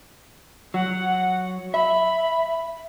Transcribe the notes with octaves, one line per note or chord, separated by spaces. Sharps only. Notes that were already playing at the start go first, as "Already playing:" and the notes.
F#3 F#5
E5 B5